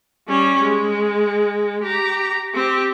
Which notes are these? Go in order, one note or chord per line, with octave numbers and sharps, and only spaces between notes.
G3 C#4
G#3
G4 A#5
C4 G4